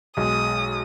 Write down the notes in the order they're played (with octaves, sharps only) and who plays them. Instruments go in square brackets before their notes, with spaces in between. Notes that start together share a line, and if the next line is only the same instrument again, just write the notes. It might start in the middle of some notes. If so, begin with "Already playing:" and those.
[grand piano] B1 G#3 [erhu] D#6